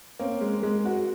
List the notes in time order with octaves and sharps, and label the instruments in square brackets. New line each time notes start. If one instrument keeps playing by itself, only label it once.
[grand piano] A#3 C4 [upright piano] C#4
[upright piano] G#3
G#3
F#4